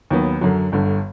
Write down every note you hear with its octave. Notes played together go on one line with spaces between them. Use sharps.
D#2 D#3 F#3 B3
F#2 D3 F#3
G1 G2 D3